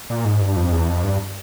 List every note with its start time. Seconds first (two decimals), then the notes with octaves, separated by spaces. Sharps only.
0.10 A#2
0.25 G#2
0.41 G2
0.57 F2
0.72 E2
0.88 F2
1.04 G2